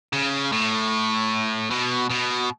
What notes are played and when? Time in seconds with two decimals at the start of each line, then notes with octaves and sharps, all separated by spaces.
0.13 C#3
0.52 A2
1.70 B2
2.10 B2